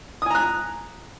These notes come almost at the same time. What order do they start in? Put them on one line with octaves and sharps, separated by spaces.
D#6 G#5 A#5 F#6